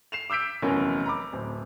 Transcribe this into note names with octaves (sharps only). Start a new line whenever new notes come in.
C7 E7 F7
D6 E6 G6 B6 D7
F1 E2 F#3 C#4 A#4
A#5 B5 D6
D1 C4